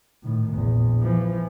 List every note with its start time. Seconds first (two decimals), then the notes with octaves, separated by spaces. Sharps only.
0.23 A2 D#3
0.54 A#1 E2
1.00 E3 F3